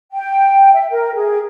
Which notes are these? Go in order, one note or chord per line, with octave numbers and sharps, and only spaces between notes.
G5
E5
A#4
G#4